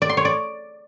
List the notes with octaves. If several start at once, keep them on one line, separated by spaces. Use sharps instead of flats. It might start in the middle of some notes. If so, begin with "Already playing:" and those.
D5
C6
C#5
D5